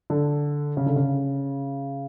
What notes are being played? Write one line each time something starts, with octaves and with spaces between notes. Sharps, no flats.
D3
C#3
D3
C#3